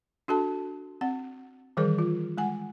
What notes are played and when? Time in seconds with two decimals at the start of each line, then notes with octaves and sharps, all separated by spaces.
0.28 D4 F#4 A4 A5
1.01 C4 F#5
1.77 D#3 E3 G3 G#4 A#4 C5
1.98 F4
2.37 G#3 F#5 G#5